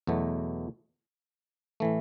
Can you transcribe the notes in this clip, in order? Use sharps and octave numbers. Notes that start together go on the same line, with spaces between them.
E2 B2 F#3 A3
A2 E3 A3